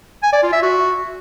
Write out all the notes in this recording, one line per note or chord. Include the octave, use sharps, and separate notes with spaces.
G#5
D5
F4
E5
F#4